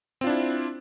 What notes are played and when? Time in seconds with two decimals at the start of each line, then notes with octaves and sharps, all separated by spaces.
0.21 C4
0.24 F4
0.27 D4
0.29 E4